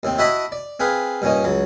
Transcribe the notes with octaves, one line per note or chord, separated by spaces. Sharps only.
D#2 A2 C4
E4 F#4 D#5 E5 A5 B5
D5
C4 G#4 B4 F5
G2 A#2 C#4 D#4
C#2 F#3